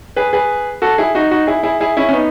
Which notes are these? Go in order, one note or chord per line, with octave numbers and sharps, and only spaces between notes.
G#4 B4
G#4 B4
F#4 A4
E4 G#4
D#4 F#4
D#4 F#4
E4 G#4
E4 G#4
E4 G#4
C#4 E4
C#4
B3 D#4